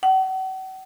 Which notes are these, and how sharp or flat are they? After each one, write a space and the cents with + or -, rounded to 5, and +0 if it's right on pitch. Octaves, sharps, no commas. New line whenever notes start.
F#5 +40